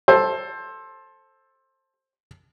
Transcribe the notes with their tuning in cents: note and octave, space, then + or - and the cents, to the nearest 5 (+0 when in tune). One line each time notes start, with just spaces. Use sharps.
A4 +0 C5 +20